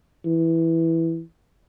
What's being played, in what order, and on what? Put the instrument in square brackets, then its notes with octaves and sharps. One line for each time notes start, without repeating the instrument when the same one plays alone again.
[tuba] E3